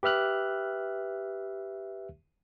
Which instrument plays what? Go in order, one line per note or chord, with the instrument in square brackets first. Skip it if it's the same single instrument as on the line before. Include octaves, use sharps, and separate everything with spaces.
[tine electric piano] G4 B4 E5 F6 F#6